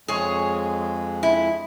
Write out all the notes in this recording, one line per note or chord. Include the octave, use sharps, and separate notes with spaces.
F2 G#3 G#4 C#5
E4